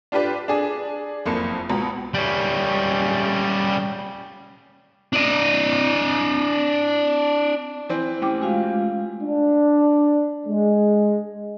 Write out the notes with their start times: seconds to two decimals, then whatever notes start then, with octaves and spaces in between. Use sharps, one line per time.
0.12 D4 F4 G4 B4 D5
0.48 D4 G#4 D5
1.26 F#1 F2 A#3 C#7
1.70 C#2 B2 A#5
2.14 G3 C#4
5.13 D4 D#5
7.89 E3 C4
8.22 A3 C#4 E4 G4 G5 D6
8.42 G#3 F4 F#4 F5
9.22 D4
10.46 G#3